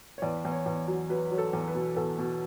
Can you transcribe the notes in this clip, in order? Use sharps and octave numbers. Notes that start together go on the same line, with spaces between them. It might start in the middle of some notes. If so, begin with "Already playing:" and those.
C#5
E2 D5
E2
C#5
E2
F#3
F#3 B4
F#3
A4
E2
B4
B2
E2 A4
B2